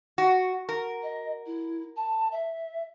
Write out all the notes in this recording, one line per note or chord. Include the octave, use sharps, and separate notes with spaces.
F#4
A#4
D#5
E4
A5
E5